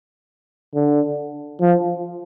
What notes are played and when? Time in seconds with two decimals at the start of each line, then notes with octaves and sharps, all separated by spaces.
0.74 D3
1.61 F3